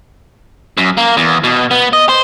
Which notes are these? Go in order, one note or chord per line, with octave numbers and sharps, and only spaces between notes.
F#2
A#3
E2
B2
B3
D#5
C5